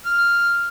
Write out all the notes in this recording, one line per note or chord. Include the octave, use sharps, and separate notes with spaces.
F6